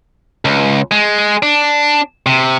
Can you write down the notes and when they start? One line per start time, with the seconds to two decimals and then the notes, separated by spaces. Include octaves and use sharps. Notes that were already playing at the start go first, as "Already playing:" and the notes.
0.45 C#2
0.91 G#3
1.43 D4
2.26 C3